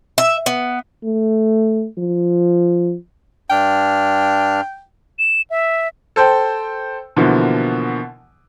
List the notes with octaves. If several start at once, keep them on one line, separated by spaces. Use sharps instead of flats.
E5
B3
A3
F3
G2 D4 G5 F6
E7
E5
A4 C5 G5
B2 D3 E3 F3 A#3